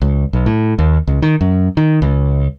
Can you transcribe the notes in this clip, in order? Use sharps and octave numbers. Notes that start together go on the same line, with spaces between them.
C#2
B1
A2
D#2
C#2
D#3
F#2
D#3
C#2